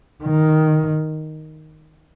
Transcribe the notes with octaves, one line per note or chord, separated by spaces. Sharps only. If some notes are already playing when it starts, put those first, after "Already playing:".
D#3